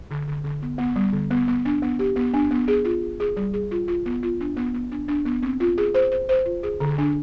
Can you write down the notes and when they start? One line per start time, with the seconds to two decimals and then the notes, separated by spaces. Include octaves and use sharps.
0.11 D3
0.28 D3
0.44 D3
0.62 B3
0.78 B3
0.96 G3
1.13 D3
1.31 B3
1.48 B3
1.65 D4
1.82 B3
1.99 G4
2.16 B3
2.34 D4
2.51 B3
2.68 G#4
2.85 F4
3.02 G#4
3.20 G#4
3.37 G3
3.54 G#4
3.71 F4
3.88 F4
4.06 B3
4.23 F4
4.41 D4
4.57 B3
4.74 B3
4.92 D4
5.08 D4
5.26 B3
5.43 C4
5.60 F4
5.78 G#4
5.95 C5
6.12 C5
6.29 C5
6.46 F4
6.63 G#4
6.80 D3
6.98 D4